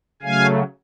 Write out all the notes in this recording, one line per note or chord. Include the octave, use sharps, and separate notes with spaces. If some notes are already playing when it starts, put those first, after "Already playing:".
C#3 F#3 A3 F5 G#5